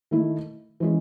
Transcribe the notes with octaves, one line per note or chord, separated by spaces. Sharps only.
D#3 A3 E4
E3 G#3 C#4 G#4